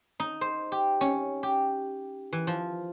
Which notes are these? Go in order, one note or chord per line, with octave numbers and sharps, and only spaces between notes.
D#4
C5
G4
C#4
G4
E3
F3